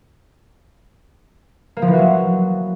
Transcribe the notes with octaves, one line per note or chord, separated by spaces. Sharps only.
A#3
F3
E3
F#4
F#3